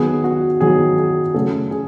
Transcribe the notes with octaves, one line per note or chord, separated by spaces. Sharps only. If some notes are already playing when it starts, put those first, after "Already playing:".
Already playing: D#3 F#3 B3 G#4
F#4
D#3 F#3 B3 G#4
G#4
C#3 F#3 A3 A4
G#4